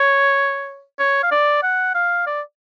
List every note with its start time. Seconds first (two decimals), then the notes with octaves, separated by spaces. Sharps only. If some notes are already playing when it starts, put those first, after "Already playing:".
Already playing: C#5
0.99 C#5
1.23 F5
1.31 D5
1.63 F#5
1.95 F5
2.27 D5